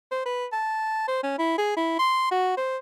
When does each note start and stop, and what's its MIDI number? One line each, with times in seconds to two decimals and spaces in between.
0.11 0.25 72
0.26 0.46 71
0.52 1.05 81
1.08 1.20 72
1.23 1.34 61
1.39 1.56 64
1.58 1.75 68
1.77 1.98 64
1.99 2.27 84
2.31 2.54 66
2.57 2.77 72